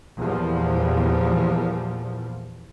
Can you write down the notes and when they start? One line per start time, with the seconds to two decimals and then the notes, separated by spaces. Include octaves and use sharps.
0.19 E2 A#2 F3 G3